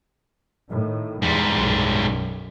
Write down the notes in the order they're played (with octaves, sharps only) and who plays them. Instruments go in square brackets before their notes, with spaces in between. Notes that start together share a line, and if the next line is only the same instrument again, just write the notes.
[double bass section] A2 D#3
[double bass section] E2 [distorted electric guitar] G#2 G3
[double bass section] B1 F#2